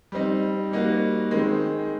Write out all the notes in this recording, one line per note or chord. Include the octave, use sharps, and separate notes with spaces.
G3 C4 D#4
G3 A#3 D#4 F#4
D#3 G#3 C4